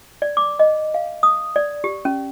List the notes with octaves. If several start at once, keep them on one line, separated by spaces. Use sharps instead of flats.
D5
D6
D#5
F5
D#6
D5
G4
C#4